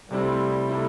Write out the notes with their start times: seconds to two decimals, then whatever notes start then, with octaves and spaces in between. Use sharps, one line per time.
0.10 C3 G3 A3 C4 E4
0.69 C3 A3 E4